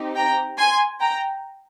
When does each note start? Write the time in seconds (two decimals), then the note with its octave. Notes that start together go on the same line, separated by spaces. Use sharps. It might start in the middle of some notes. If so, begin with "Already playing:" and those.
Already playing: C4 D#4 G4
0.16 G5 A#5
0.58 G#5 C6
1.00 G5 A#5